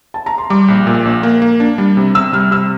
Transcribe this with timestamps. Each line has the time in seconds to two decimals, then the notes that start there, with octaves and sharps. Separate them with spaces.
0.14 A5
0.26 A#5
0.38 C6
0.50 G3 D6
0.68 A#1
0.87 A#2
1.05 A#1
1.23 A#3
1.42 A#3
1.60 D4
1.78 G3
1.97 C3
2.15 C3 E6
2.33 G3 F6
2.51 C3 E6